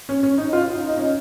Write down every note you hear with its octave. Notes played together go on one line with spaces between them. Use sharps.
C#4
C#4
D#4
F4
D#4
D#4
C#4